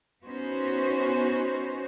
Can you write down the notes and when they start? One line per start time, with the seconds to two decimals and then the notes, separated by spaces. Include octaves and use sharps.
0.24 B3 C#4 D#4 F#4 C5